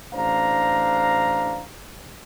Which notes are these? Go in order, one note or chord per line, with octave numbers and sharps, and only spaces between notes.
A1 D4 C5 F5 A#5